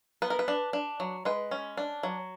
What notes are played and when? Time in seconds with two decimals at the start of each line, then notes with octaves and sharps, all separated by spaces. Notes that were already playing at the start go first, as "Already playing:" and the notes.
0.22 B3 B4
0.30 A#4
0.39 B4
0.48 D4
0.73 D4
1.00 F#3
1.25 G#3 B4
1.51 C#4
1.77 D4
2.03 F#3